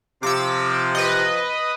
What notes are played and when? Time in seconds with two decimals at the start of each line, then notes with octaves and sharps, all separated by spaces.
0.23 C3 F3 D6 E6
0.95 B4 D#5